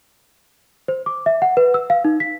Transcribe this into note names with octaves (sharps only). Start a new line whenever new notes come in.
C5
D6
E5
F#5
B4
E6
F5
D#4
B6